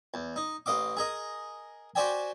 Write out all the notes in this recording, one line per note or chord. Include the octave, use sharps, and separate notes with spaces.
E2
D#4
A1 D#5 F5 D6
G#4 A#4 D#5
F#4 G4 C5 D5 G5 G#5